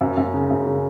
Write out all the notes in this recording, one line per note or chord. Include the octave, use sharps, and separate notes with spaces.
F#2
F#2
C#3
F#2
C#3